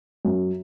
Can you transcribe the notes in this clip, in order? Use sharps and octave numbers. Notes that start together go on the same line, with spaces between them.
F#2